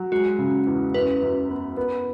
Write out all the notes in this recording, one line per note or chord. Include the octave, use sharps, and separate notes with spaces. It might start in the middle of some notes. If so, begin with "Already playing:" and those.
Already playing: F#3
G#3 F#4
C#3
E2
F#2 B4
F#2
B3
B3